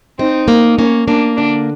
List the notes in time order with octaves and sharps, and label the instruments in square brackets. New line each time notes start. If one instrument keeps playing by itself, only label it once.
[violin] C4 [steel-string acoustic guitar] D#4
[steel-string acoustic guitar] A#3
[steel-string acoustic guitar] A#3 [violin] C#4
[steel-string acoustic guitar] A#3 [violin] D4
[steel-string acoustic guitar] D3 [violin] D4